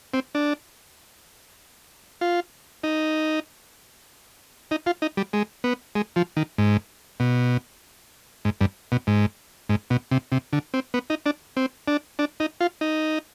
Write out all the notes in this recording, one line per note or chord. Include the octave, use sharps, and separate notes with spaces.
C4
D4
F4
D#4
D#4
F4
D#4
G3
G#3
B3
G#3
F3
D#3
G#2
B2
G#2
G2
B2
G#2
G#2
B2
C3
C3
D3
C4
B3
D#4
D4
C4
D4
D4
D#4
F4
D#4